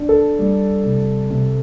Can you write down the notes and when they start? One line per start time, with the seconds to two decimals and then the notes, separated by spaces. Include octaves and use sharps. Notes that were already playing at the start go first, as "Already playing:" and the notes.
Already playing: D4
0.09 A4
0.39 G3
0.85 C3
1.30 C3